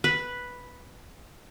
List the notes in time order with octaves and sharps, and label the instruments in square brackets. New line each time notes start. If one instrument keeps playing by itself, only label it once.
[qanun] B4